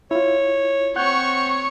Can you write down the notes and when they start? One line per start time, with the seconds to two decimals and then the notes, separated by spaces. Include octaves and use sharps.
0.11 E4 F4 C#5
0.96 C4 C#5 F#5 C#6 F#6 G6